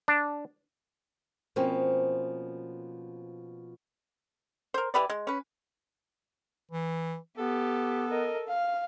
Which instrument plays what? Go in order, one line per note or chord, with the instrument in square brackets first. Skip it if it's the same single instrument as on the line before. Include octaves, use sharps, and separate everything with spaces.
[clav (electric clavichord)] D4
[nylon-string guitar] B2 F3 A#3 C4 C#4
[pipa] A#4 C5
E3 G4 B4 D5
G#3
C#4 B4
[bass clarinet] E3
[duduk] B3 [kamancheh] G4 [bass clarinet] A4
[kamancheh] A#4 D#5
F5